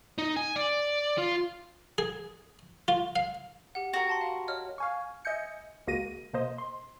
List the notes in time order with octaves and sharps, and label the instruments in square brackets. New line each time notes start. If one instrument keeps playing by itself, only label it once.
[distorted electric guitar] D#4
G#5
D5
F4
[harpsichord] G#4
F4
F5
[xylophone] G4 F#5
[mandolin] F#4 A#4
[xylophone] G5 A5 C6
F5
C#5 D#5 F6
[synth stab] F5 G#5 C#6
D#5 E5 G#5 G6 C#7
C#2 G#3 A#3 F#4 A#6 D#7
B2 A#3 C5 D#5
C6